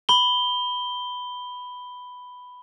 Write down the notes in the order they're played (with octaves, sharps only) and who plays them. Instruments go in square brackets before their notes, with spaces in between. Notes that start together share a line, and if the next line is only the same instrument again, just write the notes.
[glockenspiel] B5 G7